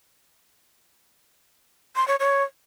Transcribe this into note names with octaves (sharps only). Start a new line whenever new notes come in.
C6
C#5
C#5